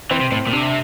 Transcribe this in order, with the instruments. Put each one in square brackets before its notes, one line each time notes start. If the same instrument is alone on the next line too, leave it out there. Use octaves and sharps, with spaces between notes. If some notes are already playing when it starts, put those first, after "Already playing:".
[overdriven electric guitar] E3 [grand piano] C4
[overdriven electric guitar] C3
[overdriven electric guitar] A2 [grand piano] C4
[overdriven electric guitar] A#2
[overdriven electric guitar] C3 [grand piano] D4